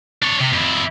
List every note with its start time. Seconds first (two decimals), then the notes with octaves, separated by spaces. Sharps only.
0.23 D4 C#5
0.41 C3
0.53 F2 E4